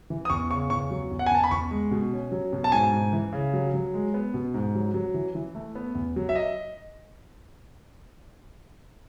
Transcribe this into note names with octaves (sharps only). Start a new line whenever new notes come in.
E3
D#6
E2 C#6
C#3 C#6
E2 C#6
F#3
E2
F#5
G#5
E2 A5
B5
E2 C#6
G#3
B2
C#4
F#3
B2
A5
G#2 G#5
G#2
E3
C#3
F#3
F#3
G#3
B3
B2
G#2
F#3
F#3
E3
E3
A3
B3
E2
F#3
E5
D#5